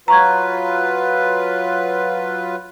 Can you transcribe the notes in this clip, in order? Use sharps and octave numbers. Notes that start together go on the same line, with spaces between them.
F#3 F4 B4 A#5 C#6 G#6